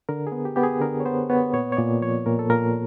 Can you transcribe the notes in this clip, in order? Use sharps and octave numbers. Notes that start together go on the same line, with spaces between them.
D3 A#4
G#4
B3
G4
B3 G4
G#4
D3 A#4
C#5
B3 C5
B3 C#5
A#2 C#5
C#5
A#2 D5
F3 C#5
A#2 A#4
A4
A#2 A#4